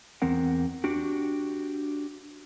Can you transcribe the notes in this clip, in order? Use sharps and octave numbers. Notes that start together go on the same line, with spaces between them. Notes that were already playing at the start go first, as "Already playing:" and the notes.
E2 C4 A#4 F#5
D4 F#4 G4